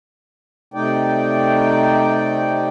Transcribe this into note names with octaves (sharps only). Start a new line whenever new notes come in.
C3 A3 D#4 D5 G5